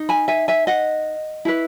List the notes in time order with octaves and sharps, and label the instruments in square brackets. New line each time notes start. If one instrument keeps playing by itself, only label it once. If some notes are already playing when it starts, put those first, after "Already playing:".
Already playing: [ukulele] D#4
G#5 B5
E5 G#5
E5 G#5
D#5 F#5
E4 G#4 B4